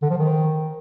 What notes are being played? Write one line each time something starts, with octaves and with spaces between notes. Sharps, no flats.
D3
F3
D#3